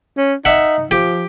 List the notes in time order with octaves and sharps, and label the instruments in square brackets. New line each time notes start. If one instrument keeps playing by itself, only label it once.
[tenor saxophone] C#4
[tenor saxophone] D#4 [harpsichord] E5 F#5
[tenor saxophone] F3 [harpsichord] G4